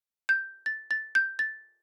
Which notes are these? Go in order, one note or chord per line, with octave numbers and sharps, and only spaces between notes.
G6
A6
A6
G6
A6